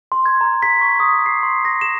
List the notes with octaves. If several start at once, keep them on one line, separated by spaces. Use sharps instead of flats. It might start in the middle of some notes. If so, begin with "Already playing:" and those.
C6
G#6
A#5
B6
C#6
D#6
D6
C7
C6
A#6
E7